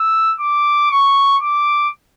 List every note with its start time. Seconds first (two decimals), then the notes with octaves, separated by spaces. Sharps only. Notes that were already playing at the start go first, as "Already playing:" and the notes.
Already playing: E6
0.40 D6
0.91 C#6
1.42 D6